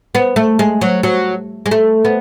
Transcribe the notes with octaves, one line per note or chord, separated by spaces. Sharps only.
B3
A3
G#3
F#3
F#3
G#3
A3
B3